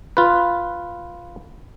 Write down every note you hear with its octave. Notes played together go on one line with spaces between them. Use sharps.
F4 B4